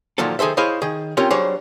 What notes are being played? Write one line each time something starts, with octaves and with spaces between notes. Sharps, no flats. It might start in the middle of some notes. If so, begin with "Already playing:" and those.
A#2 D#3 F3 F#3 F4 A4
D#3 G#4 A4 C5 E5
E4 G#4 C5 C#5 D#5 F5
D#3 G#4
C4 C#4 F4 G4 A#4 C#5
F#3 G3 D4 G#4 C5 C#5